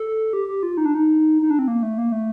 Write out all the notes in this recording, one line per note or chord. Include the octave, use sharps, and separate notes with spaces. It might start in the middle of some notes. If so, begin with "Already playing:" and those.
Already playing: A4
G4
G4
F4
D#4
D4
D#4
D#4
D4
C4
A#3
A3
A#3
A3